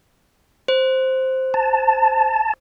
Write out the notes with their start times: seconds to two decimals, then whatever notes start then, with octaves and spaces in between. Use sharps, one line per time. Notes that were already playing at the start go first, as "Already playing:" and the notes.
0.68 C5
1.54 A5